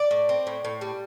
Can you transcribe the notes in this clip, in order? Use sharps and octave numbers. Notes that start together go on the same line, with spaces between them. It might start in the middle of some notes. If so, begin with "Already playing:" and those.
Already playing: D5
A2
C4
A2
A2
G3